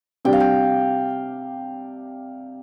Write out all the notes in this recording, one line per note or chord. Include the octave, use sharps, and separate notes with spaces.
C3 G3 D4 G5
F5
G5